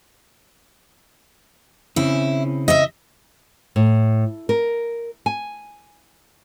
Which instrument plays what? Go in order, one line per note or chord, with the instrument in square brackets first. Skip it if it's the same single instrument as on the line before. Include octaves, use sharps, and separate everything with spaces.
[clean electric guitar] C#3 C4 C#4 [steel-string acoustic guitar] E4
[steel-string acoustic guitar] D#5 E5
[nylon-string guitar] A2
A#4
G#5